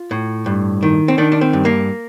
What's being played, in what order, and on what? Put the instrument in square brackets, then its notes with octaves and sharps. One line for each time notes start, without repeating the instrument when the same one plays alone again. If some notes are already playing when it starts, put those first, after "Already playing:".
Already playing: [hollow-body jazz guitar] F4
A2
G2
D#3
C4
D#3 D4
D4
C4
G2
A#3